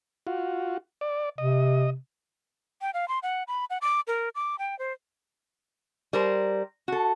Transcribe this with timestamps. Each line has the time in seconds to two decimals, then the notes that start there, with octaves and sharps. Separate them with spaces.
0.27 F4 F#4
1.01 D5
1.38 C3 D#5
2.81 G5
2.94 F5
3.08 C6
3.23 F#5
3.48 B5
3.70 F#5
3.82 D6
4.07 A#4
4.35 D6
4.59 G5
4.79 C5
6.13 G3 A#4 C5
6.88 F#4 A4